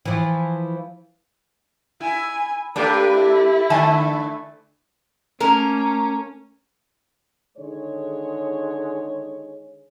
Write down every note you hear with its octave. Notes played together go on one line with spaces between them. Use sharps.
E3 F3
E4 G#5
A3 A#3 D4 G4 A4 B4 D5
E4
D3 A3 G#5 A5
A3 A#3 C#4 A#4 A#5
D3 D#3 G#3 G#4 C#5